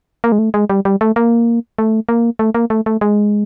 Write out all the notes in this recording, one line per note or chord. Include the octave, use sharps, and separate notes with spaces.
A#3
G#3
A3
G#3
G3
G3
A3
A#3
A3
A#3
A3
A#3
A3
A3
G#3